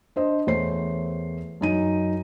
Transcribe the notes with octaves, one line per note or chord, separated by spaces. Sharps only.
D4 C5 D#5
E2 A3 C5 C#5 C7
F#2 D#4 D#7